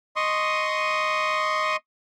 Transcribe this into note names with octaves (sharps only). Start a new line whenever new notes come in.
D#5 C6 C#6 D#6